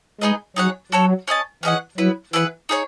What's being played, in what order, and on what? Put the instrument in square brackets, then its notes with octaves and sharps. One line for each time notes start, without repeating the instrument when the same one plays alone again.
[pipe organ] G#3 [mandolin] D#4 G#4 B4 D#5
[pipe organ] F#3 [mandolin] D#4 G#4 C#5 F#5
[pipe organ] F#3 [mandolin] F#4 A4 C#5
[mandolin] C#4 G#4 D#5 A5
[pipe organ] E3 [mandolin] C#4 G#4 D#5 F#5
[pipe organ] F#3 [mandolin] B3 E4 B4
[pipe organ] E3 [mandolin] E4 G#4 B4 F#5
[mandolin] D#4 G#4 C#5